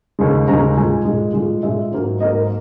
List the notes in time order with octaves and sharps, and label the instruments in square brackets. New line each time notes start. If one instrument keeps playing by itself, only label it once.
[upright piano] D#2 C#3 G#3
D#2 C#3 G#3 A#5
A#2 G#3 G#5
A#2 G#3
A#2 G#3
A#2 G#3 E5
G#2 F#3 A#3
G#2 F#3 A#3 D#5
A#4